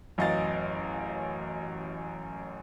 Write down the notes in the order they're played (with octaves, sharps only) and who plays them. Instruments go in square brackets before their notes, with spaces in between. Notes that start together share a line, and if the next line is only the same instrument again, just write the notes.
[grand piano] A1 F#2 D#5 F5 A6